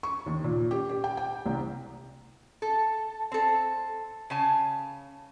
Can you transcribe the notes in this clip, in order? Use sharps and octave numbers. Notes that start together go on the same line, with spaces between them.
C#6
D#2
A#2
G4
G4
G5
G5
C2
A4
C4 A4
C#3 G#5 A5